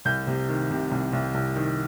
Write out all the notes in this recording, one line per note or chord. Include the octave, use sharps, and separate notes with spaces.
C2 G6
C3
D#3
C3
C2
C2
C2
D#3